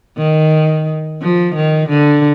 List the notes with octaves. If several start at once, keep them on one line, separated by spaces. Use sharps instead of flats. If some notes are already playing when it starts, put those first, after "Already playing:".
D#3
F3
D#3
D3